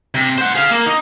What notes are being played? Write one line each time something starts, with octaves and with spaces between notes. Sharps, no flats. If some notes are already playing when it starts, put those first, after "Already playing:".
C3
C5 F#5
G#4 F5
A#3
D#4